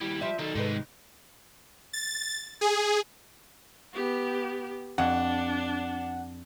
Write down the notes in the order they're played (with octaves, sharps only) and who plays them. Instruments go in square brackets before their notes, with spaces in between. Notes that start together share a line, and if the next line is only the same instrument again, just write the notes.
[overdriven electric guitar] D#2 E4 [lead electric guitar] G3
[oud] F3 D#5 [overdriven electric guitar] E5
[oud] D#3 [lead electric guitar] F#3 D#4 [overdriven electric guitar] A4
[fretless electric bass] G#2 [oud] C3 D#4 B4 [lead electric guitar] D#3 G#3
[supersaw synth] A6
G#4
[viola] B3 G4
[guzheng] F2 [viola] D4 [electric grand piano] F#5